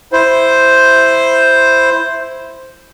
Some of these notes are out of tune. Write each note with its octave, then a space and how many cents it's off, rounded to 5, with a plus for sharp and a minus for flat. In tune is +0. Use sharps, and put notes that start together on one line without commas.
E4 +0 C5 +0